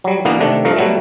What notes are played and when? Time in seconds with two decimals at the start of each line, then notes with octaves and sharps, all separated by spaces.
0.04 F#3 G3
0.25 B2 D3 E3 A#3 B3
0.40 C3 D#3 A3 D4
0.65 G2 F3 A3 A#4
0.76 B2 F#3 G3 A3